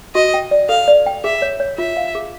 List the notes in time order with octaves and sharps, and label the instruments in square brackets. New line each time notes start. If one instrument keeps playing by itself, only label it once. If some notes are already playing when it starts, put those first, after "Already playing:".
[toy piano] F#4 [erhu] D#5
[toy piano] G5
D5
[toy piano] A4 [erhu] F5
[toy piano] D5
G5
[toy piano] G#4 [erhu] E5
[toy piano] C#5
C#5
[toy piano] F4 [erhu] E5
[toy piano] F5
G#4